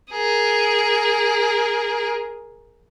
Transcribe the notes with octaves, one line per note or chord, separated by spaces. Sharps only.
G#4 A#4